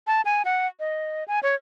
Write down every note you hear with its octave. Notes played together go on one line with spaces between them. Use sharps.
A5
G#5
F#5
D#5
G#5
C#5